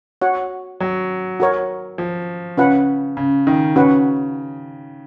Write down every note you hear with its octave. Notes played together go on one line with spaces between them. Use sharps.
F#4 C#5 F#5
F#3
F#4 A#4 C#5
F3
C#3 C#4 F4 B4 F#5
C#3
D#3
C#3 C#4 F#4 B4 F#5